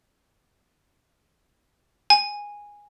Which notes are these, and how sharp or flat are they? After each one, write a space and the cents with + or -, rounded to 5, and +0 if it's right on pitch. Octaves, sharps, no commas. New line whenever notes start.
G#5 -10